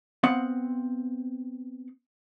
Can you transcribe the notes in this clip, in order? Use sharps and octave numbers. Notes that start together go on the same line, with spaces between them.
B3 C4 F5 F#5